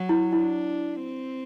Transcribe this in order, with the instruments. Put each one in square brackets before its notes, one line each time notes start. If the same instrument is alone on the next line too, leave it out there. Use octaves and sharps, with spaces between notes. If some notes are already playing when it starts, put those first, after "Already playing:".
Already playing: [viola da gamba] F#3
[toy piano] E4
[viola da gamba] D4 [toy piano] E4
[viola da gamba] C4